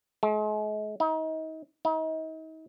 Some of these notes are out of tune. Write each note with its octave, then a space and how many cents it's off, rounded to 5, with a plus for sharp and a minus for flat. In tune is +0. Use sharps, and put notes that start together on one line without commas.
G#3 +40
D#4 +35
D#4 +40